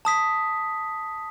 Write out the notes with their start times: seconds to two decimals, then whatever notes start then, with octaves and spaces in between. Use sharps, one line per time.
0.05 A5 D#6 B6